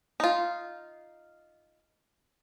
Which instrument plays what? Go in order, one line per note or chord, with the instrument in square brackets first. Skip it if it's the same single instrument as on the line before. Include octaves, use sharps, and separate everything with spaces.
[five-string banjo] D#4 F4